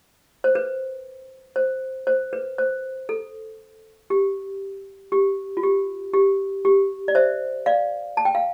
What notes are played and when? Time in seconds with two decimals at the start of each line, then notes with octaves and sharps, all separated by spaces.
0.44 C5
0.55 B4
1.56 C5
2.07 C5
2.33 B4
2.58 C5
3.09 A4
4.10 G4
5.12 G4
5.57 F4
5.63 G4
6.13 G4
6.65 G4
7.08 D5
7.15 C5 E5
7.66 D5 F5
8.17 A5
8.25 G5
8.35 F5